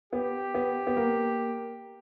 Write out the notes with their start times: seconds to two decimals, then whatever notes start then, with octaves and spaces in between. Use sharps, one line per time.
0.13 B3 G4
0.54 B3
0.87 B3
0.97 A#3